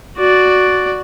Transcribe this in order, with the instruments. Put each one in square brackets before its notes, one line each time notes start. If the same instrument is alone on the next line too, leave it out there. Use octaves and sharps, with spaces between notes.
[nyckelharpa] F#4 D5